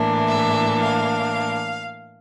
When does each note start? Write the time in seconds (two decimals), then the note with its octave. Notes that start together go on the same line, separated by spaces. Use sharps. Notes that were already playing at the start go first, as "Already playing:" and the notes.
Already playing: A2 E3 A#3 D4
0.28 E5
0.82 F5